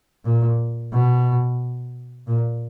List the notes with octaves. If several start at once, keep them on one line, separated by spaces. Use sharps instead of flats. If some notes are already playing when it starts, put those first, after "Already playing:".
A#2
B2
A#2